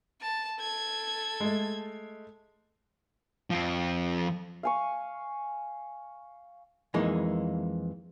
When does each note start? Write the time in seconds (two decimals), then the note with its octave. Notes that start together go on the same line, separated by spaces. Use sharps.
0.21 A5
0.59 A4 G#6
1.40 G#3 A3
3.50 F2 F3
4.63 F5 G#5 C#6
6.94 F2 E3 G#3 A#3 D#4